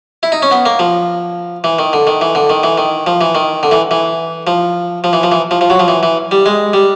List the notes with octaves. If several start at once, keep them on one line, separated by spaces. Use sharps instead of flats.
E4
D#4
C#4
B3
A#3
F3
E3
D#3
D3
D#3
E3
D3
D#3
E3
D#3
F3
E3
D#3
D3
E3
E3
F3
F3
E3
F3
E3
F3
F3
F#3
F3
E3
E3
G3
G#3
G3